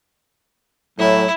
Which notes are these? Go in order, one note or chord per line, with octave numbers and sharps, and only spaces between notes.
A2 F#3 E4